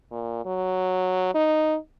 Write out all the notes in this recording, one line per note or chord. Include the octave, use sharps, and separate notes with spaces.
A#2
F#3
D#4